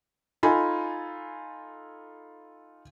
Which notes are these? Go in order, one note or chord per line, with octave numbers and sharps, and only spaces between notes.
D#4 F4 A4 G#5 B5